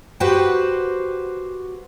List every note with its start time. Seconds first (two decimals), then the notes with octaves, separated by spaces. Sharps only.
0.20 F#4 G4 B4 C5 F#5 G5